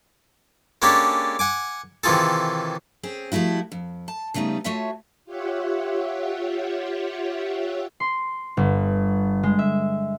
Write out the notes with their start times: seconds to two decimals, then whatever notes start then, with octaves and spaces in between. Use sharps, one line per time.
0.82 G#3 A#3 C#4 D4 G4 A4
1.39 F#5 G#5 D6
2.04 C3 D#3 E3 F4 G#4 A4
3.03 C4 C#4 G#4
3.32 F3 G3 A3 E4 F#4
3.72 F2
4.08 A5
4.34 C#3 G3 A3 B3 D#4
4.64 A3 F4 F#4 C#5 E5 A5
5.25 F4 G4 C#5 E5 F#5
8.00 C6
8.57 G1
9.43 G#3
9.59 E5